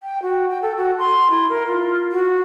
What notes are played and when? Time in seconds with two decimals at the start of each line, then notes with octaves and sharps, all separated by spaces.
0.03 G5
0.22 F#4
0.50 G5
0.62 A4
0.77 F#4
0.99 C6
1.31 E4
1.49 A#4
1.67 F4
2.12 F#4